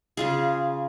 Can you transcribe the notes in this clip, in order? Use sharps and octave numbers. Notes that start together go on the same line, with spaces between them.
C#3 F4 G#4